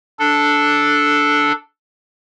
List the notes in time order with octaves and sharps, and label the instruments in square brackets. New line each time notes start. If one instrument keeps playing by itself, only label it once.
[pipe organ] D4 A4